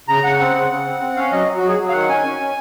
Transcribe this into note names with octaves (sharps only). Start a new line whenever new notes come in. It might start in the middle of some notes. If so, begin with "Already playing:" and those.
C#3 A#5
C#3 F#5
C4 F#5
C#3
C#3
C4
C4
C#4 F5
F#3 D#5
F#3
F#4
F#3 G#4
F#3
F5
D#3 F#5
C#4 G#5
C#4
C#4